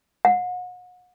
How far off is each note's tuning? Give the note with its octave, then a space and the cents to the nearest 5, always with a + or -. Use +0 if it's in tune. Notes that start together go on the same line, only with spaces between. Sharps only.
F#5 -40